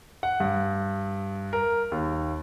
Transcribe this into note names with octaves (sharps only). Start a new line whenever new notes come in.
F#5
G2
A#4
D#2